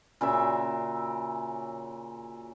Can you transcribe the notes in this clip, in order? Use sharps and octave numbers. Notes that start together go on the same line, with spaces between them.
A#2 C#3 F#4 E5